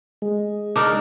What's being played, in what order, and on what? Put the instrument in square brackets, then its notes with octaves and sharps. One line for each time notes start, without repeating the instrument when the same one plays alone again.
[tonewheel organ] G#3
[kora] D4 D#4 A#4